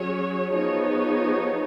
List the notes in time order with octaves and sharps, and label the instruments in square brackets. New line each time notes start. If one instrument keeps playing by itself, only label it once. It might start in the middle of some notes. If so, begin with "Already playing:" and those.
Already playing: [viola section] F#3 C#4 G#4 C#5
F3 B3 D#4 G#4 C#5